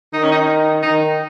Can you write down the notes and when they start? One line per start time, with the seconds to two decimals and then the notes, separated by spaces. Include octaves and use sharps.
0.13 D#3 D#4
0.23 C#4
0.32 D#4
0.83 D#3 D#4